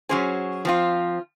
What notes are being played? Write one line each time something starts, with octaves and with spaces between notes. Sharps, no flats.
F#3 C#4 G#4 C5
F3 C4 F4